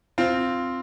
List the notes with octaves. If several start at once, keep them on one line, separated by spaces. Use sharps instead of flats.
C4 F4